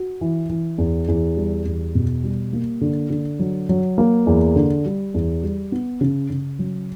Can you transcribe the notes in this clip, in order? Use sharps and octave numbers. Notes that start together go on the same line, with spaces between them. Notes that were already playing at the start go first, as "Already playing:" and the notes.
Already playing: F#4
E3
E3
E2
E2
G3
E2
B2
G3
A#3
D3
D3
F#3
F#3
A#3
E2
D3
G3
E2
G3
B3
C#3
C#3
F#3